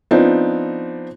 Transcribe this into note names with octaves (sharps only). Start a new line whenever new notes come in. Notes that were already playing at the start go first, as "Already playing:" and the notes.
F3 B3 C4 D4 D#4